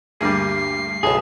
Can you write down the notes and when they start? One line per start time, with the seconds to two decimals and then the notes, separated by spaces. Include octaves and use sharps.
0.21 D2 G2 G3 A#3 G#4 C7
1.03 F#1 B1 A2 G#4 A4 A5